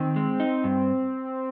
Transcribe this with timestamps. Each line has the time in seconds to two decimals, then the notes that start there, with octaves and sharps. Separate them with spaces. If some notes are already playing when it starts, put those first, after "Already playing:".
Already playing: D#3 C4
0.16 G#3
0.40 D#4
0.64 G2